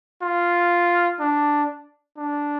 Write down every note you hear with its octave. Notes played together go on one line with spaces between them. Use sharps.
F4
D4
D4